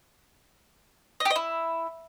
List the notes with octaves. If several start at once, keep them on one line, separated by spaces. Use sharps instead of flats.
D#5
G4
D#5
E4